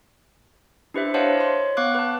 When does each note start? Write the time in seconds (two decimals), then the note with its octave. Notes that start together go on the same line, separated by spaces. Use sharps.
0.94 D4 E4 G4 B4 C5 E5
1.14 C5 C#5 D#5 F5 F#5 A5
1.38 C#5 C6
1.77 B3 F5 C#6 D6 F#6
1.95 B4 A5